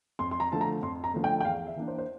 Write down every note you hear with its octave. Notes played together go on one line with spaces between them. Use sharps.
F2 C6
C6
A#5
D3 F3 A3 A5
A#5
F2 C6
A#5
D3 F3 A3
G5
G5
E2 F5
E5
E3 A#3 D4
C5
C5